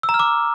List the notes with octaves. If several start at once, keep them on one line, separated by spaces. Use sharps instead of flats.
E6
A#5
F6
D6